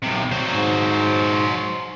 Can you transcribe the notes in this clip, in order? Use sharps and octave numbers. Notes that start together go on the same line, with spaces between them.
B1 C3
F#3 C5
G#2